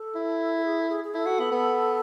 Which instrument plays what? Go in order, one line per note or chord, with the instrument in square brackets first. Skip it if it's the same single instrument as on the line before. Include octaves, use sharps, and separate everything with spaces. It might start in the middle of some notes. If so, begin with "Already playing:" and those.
Already playing: [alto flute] A4
[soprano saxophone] E4
[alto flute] A4
G#4
A4
G#4
G#4
[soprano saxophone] E4 [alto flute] A4
[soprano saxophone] F#4
B3
B3